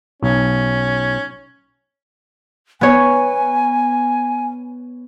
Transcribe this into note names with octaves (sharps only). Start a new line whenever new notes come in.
B1 C#4
B3 C#5 G#5